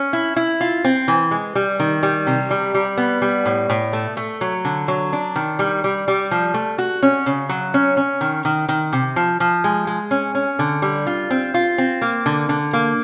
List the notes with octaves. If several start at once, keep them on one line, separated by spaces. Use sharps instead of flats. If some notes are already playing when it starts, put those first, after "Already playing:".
Already playing: C#4
E4
E4
F4
C4
E3
G#3
G3
D#3
G3
C3
G3
G3
B3
G3
A2
A2
A3
A3
F#3
D3
F#3
D4
D#3
G3
G3
G3
F3
A3
F#4
C#4
C#3
F#3
C#4
C#4
D#3
D#3
D#3
C3
F3
F3
G#3
G#3
C#4
C#4
D3
G3
F4
C4
F4
C4
A#3
D3
D3
A#3